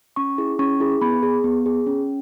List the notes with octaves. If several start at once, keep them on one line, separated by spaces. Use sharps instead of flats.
C#4 C#6
E4 G#4
C#4 C#6
E4 G#4
B3 B5
G#4
B3
G#4
C#4